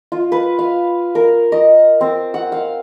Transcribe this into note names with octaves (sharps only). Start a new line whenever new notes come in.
F4
B4
F5
A#4
D#5
C4
F#5
F5